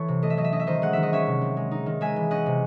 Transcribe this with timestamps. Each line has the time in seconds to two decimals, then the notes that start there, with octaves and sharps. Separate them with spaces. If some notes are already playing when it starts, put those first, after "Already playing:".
Already playing: E3 A4 C#5
0.08 C3
0.22 A3 D#5
0.30 E5
0.37 F#3 D#5
0.44 E5
0.52 C#4 D#5
0.60 E5
0.67 D#3 C5 D#5
0.82 G#3 F#5
0.93 D#3 E5
1.03 D#5
1.12 C#4 C#5 E5
1.27 C3
1.41 C4
1.57 G#3
1.71 D#4
1.86 D#3
2.01 G#3 E5 G#5
2.16 E3
2.31 C#4 D#5 F#5
2.46 C3